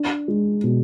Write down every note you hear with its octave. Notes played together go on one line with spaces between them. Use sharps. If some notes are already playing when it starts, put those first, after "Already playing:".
Already playing: D4
G#3
B2